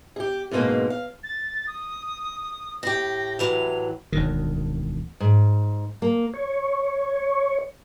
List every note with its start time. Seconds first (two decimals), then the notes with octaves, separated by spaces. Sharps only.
0.16 G4 G#4
0.51 F2 G#2 B2 G#3 A#3
0.90 F5
1.24 A6
1.67 D#6
2.83 A2 G4 A#6
3.39 A2 E3 F#3 F7
4.12 E1 D2 D#3
5.20 G#2
6.02 A#3
6.34 C#5